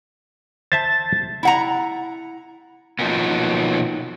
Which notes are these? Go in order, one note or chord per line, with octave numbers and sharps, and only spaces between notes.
C5 E5 A5 A6
E4 F#5 A#5
B2 D#3 F3 F#3 A#3 B3